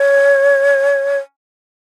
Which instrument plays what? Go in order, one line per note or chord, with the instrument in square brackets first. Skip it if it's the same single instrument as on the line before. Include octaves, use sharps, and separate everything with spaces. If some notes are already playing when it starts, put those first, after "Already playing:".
Already playing: [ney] C#5